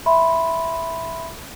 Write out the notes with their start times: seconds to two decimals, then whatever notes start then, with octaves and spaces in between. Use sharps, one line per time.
0.06 E5 B5 C6